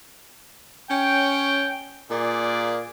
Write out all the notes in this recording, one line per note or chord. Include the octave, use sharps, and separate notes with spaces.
C#4 C#5 G5
A#2 A#3 G#4 D5